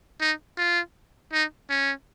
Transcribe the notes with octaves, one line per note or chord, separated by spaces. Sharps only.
D#4
F4
D#4
C#4